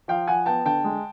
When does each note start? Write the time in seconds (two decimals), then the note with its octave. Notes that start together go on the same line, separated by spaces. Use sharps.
0.08 F3 F5 G5
0.28 F3 F#5 G#5
0.46 B3 G5 A5
0.65 D3 G5 A5
0.84 G#3